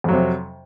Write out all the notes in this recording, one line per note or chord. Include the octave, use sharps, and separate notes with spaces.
F2 C3 F#3